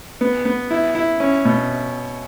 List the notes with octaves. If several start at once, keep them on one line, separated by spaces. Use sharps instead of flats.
B3
B3
E4
E4
C#4
B2